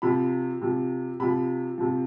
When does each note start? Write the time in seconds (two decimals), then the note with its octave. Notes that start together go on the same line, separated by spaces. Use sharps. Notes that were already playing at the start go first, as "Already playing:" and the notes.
0.02 C3 F3 B5
0.61 C3 F3
1.20 C3 F3 B5
1.78 C3 F3